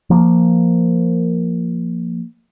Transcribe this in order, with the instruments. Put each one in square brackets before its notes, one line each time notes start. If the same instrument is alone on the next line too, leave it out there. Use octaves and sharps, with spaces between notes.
[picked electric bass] F3 A#3